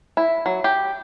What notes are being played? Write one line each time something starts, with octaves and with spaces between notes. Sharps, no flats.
E4
F#3
G4